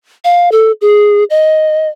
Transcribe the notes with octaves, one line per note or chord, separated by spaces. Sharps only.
F5
A4
G#4
D#5